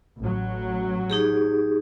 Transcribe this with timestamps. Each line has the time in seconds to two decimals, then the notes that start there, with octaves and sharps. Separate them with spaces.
0.19 A1 F#3
1.10 D#4 G4 G#4